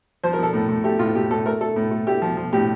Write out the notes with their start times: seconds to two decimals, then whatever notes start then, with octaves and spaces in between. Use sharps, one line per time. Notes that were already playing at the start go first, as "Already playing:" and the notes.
0.23 F3 C5
0.33 A#4
0.39 F3 A4
0.54 A2
0.69 A2
0.84 A3 G4
0.99 A2 F4
1.15 A2 G4
1.30 A2 A4
1.46 A3 A#4
1.61 A3 A4
1.76 A2
1.91 A3
2.07 A3 G4
2.22 F3
2.37 F3
2.53 A2 G4